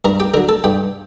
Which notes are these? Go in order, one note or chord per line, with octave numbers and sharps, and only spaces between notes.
G2 A#4 A#5
G4 G5
D3 F#3 A#4 A#5
A4 A5
G2 G4 G5